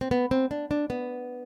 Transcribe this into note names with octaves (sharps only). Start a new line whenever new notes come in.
C4
B3
C4
D4
D4
B3